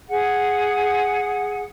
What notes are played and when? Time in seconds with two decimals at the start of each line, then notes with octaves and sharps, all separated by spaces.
0.09 G#4 F#5